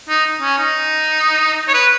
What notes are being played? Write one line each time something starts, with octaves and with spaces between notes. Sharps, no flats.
D#4
C#4
D#4
C#5
B4